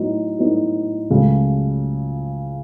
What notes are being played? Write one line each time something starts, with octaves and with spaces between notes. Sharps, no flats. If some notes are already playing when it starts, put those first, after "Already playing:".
Already playing: A2 F#3 B3 D#4
A2 F#3 B3 D#4
C#2 C#3 F#3 A3